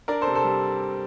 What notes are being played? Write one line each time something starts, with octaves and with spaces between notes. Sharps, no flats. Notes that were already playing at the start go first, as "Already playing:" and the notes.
D4 A#4 D5
A4 C5
C3
A4 C5
G3